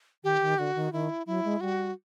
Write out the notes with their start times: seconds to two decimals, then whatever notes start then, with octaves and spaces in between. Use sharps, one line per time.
0.24 D#3 G4
0.41 D#3
0.58 D3 F#4
0.75 D#3
0.92 D#3 E4
1.27 F#3 E4
1.44 G#3
1.61 G3 F#4